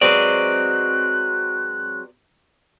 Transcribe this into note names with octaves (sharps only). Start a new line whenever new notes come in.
F#3 G#3 C4 B4 D5 F#6